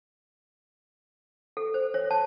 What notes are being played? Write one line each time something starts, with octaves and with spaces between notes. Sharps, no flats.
A4
C5
C#5
A5